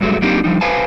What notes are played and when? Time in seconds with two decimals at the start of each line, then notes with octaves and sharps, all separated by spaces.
0.01 G2 F#3 G#3 A3
0.22 F#3 A#3 C4 D4 D#4 G4
0.44 D3 F3 G3 D#4
0.61 B4 C5 F5 G#5 A5